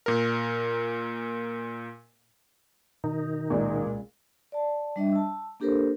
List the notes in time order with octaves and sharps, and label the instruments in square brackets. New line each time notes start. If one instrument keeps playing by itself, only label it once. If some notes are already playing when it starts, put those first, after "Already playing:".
[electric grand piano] A#2 A#4
[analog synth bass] B2 [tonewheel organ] D#3 D#4
[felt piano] C#2 D5 [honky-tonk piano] A#2 G#3
[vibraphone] D5 A5
G3 D4 D#5 E5
A5 E6
A#3 D4 G4 A4 A#4 C5